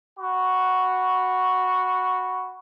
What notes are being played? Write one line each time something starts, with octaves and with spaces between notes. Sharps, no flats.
F#4 B5 C#6